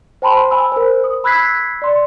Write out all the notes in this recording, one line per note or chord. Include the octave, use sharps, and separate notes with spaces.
C5 G5 A5 B5 C6
G#5 B5 E6
A#4 C5
D#6
B5 E6 F#6 G#6 B6 C7
D5 C6